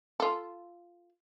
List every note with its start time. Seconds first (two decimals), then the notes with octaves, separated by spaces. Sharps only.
0.20 F4 A4